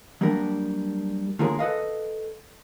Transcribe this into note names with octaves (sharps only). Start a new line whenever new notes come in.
F#3 G3 A#3 D4 A#4
D3 A#3 F4 G#4 A#4 C#5
A4 B4 D#5 F5